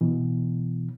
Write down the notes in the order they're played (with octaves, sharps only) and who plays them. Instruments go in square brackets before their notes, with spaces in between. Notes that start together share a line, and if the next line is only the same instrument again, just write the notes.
[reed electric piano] B2 E3